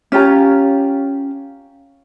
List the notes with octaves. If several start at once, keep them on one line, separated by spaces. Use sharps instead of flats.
C#4 F4 G4 A#5